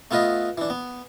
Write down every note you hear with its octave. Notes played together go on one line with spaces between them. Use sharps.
A3 B3 F4 B4 D#5
E3 D4
B3